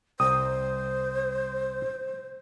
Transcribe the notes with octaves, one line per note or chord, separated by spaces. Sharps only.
C2 C5 G5 A#5 D#6